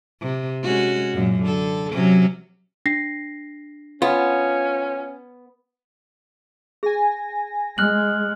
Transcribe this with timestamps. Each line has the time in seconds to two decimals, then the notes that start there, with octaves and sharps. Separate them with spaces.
0.21 C3
0.63 G#3 C#4 F#4
1.13 F#2 A#2
1.42 D3 A4
1.92 C3 F#3 C#4
2.86 D4 A#6 C7
4.02 B3 C#4 F4
6.83 G#4 G#5 A#6
7.78 G#3 F6 F#6 F#7